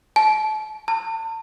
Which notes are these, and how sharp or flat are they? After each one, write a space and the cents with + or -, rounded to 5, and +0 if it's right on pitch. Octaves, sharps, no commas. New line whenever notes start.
A5 -30
A5 +35